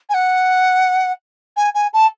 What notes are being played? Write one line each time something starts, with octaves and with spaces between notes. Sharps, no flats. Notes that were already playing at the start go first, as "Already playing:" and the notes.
G#5
F#5
G#5
G#5
A5